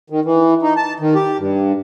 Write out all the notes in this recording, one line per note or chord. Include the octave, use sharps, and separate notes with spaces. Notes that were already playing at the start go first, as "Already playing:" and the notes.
D#3
E3
D#4
A5
D#3
G4
G2